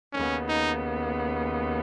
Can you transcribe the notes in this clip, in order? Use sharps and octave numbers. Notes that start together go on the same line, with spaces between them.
D#2 C#3 B3 C#4
D#4